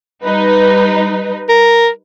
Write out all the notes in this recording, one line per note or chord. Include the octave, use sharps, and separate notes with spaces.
G3 D#4 B4
A#4